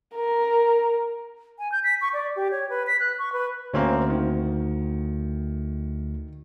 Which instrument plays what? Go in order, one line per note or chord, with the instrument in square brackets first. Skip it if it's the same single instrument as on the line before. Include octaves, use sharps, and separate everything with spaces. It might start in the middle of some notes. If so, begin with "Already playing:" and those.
[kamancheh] A#4
[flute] G#5
G6
B6
C#6
D5
G4
C#5
B4
B6
F#6
C#6
B4
[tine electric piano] D2 [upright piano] A#3 C4 C#4
[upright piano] D#3